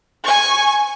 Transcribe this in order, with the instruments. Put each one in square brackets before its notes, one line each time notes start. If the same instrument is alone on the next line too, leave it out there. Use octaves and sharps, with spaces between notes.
[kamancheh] G#5 C#6